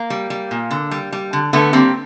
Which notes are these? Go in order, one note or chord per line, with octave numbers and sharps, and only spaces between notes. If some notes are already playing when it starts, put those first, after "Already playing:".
Already playing: A#3
G3
G3
A#2
D3
G3
G3
D3
D3 A3 B3
G3 A#3 C4